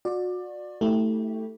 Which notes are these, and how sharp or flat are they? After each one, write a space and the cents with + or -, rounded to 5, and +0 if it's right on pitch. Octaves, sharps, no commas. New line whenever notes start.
F#4 -35 D5 +15
A3 +10 E4 -30 G4 +0